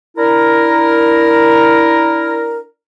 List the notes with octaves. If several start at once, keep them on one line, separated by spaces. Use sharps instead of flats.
D4 E4 A#4